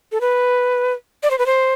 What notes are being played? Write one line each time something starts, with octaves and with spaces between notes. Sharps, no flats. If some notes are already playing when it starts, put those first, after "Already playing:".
A4
B4
D5
C5
B4
C5